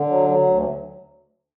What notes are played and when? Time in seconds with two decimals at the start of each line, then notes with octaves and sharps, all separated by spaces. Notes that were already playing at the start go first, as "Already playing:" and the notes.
Already playing: D3
0.08 F#3
0.29 F#3
0.48 D2